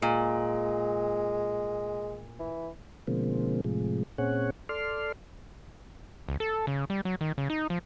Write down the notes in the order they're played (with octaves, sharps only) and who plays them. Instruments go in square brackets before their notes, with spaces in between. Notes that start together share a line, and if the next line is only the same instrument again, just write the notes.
[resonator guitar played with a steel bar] A#2 [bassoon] G#3
[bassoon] E3
[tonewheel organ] B2 D3 F3 G#3 A#3 C4
A2 C3 F3 G#3
A#2 C4 C#4 G#4 C#5 F#5
A4 D5 C6 F6
[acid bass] C#2
A4
C#3
G3
F#3
D#3
C#3
D#4
F3